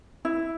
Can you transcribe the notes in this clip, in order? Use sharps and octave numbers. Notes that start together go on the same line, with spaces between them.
E4